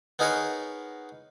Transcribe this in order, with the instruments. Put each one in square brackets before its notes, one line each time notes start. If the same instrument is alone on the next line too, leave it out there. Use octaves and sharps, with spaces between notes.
[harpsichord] B3 D#4 G#4 A#4 B4 C#5